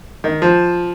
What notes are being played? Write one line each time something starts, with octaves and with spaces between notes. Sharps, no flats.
D#3
F3